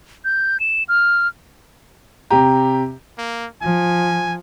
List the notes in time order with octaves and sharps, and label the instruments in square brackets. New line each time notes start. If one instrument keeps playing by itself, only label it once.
[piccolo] G6
E7
F6
[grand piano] C3 G4 [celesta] A#5
[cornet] A#3
[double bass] F3 [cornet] G#5